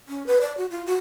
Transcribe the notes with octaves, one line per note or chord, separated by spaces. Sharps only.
C#4
B4
D5
F#4
F4
F#4